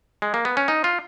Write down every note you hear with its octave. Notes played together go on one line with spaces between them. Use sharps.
G#3
A#3
B3
C#4
D#4
F4